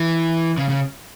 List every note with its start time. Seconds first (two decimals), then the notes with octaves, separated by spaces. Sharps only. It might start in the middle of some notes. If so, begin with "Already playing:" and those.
Already playing: E3
0.57 C#3
0.69 C#3